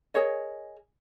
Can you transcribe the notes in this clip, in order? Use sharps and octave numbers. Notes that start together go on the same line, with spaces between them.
G#4 A#4 C#5 D#5